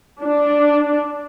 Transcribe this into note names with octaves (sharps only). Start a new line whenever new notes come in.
D4